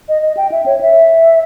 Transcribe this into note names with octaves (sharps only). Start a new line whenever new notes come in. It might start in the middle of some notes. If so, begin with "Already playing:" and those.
D#5
D#5
G5
E5
C#5
E5